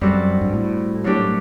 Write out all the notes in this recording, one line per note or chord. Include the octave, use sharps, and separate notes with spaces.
F#2 G3 C4 F#4 A4
G2
A2
F#2 F#3 A3 D4 G4